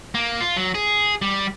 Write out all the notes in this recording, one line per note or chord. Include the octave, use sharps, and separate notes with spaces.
A#3
F4
F#3
G#4
G3